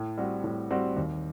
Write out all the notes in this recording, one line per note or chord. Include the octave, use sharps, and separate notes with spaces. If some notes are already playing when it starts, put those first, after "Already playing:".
Already playing: A2
G3 C4 F#4
A2
G3 C4 F#4
D#2